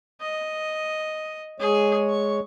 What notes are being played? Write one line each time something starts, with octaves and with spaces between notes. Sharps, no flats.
D#5
G#3 G#4 C#5
C#6